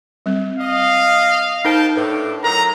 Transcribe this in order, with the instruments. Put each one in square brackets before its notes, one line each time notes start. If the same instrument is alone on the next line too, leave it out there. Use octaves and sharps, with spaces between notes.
[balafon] G3 C4
[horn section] D#5 [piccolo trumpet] F5
[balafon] D#4 A#4 C5 [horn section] G5 A5
[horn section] A2 D4 [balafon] B4
[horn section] A2 F#3 D#4 [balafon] A#4 [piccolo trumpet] A#5